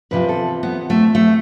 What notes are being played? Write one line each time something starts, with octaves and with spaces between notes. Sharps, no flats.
E2 C3 F3 B4
A4
B3
A3
A3